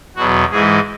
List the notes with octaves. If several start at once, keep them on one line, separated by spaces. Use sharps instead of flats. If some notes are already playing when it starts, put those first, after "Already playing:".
E2 B2 F#3 F#4
G#2 E3 G#3 G#4